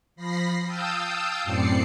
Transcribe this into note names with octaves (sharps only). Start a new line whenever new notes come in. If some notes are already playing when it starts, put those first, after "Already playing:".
F3 B5 A#6 C7
F5 G5 A5 D#6 E6 G6
F#2 A2 C4 D5 C7 C#7